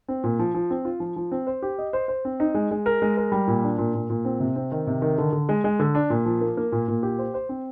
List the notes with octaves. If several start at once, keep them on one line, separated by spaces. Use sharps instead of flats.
C4
A#2
F3
F3
C4
F4
F3
F3
C4
C5
G4
D#5
C5
C5
C4
D#4
G#3
G#3
A#4
G#3
A#4
G3
A#2
D4
A#2
A#2
A#2
C4
C3
C4
D#3
C3
D#3
D3
D3
G#3
G#3
D3
D4
A#2
F3
A#3
A#3
A#2
A#2
G4
C5
C5
C4